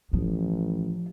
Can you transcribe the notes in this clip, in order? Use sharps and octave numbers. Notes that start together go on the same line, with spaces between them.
A1 F3